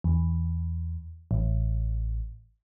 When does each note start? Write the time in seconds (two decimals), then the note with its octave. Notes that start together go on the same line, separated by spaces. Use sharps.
0.04 E2
1.31 A1